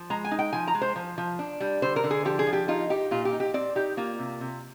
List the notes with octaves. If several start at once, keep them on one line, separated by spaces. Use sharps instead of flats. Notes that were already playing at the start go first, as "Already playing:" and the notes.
Already playing: F3
G#3 A#5
G#5
D#4
G5
F3 G#5
A#5
G#3
C5
F3
F3
D4
G3
D3 C5
A#4
D3
G#4
F3 G4
G#4
F3
G4
D#4 F4
D#4 G4
A#2 F4
G4
D#4
G4
C4 D5
D#4 G4
A#3 F4
C3
C3